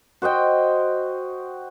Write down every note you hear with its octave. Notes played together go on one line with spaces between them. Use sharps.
F#4 C5 D#5 G5